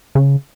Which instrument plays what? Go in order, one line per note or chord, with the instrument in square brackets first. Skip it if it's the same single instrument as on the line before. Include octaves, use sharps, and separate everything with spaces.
[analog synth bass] C#3